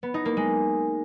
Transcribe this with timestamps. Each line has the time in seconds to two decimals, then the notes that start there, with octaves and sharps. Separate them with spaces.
0.03 B3
0.14 D#4
0.25 A#3
0.37 G#3